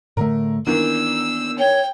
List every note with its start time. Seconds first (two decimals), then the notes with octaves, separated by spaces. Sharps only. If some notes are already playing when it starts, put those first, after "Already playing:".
0.17 A2 D3 A3 A#4
0.67 D#3 E3 A#3 B3 D4 E6
1.58 C#5 G5